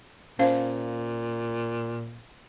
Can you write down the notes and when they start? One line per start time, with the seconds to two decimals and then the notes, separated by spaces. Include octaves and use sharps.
0.39 A#2 C#4 C5 F5